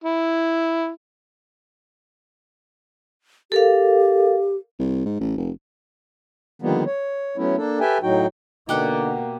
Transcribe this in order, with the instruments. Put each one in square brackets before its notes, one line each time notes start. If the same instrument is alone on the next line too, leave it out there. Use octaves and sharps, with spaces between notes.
[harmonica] E4
[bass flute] G4 [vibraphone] A4 A#4 F5
[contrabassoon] C2
G#2
A1
F1
[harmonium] D3 D#3 F3 G3 A#3 B3
C#5
F#3 A3 B3 C#4 E4
A#3 D4 A4
G4 A4 B4 E5 G5 G#5
A2 F#3 D#4 F#4 G5
[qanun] B2 [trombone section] D3 D#4 [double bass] A#3 [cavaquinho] G4 F#5 D6